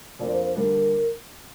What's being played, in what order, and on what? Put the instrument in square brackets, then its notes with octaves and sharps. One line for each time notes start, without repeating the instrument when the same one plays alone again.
[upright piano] F2 F3 A#3 D4 [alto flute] D5
[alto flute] C5
C5
[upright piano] D3 G3 A#3 D4 [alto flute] A#4